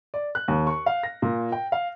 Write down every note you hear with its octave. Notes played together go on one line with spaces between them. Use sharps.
D5
F#6
D#2
C#6
F5
A#6
A#2
G5
F5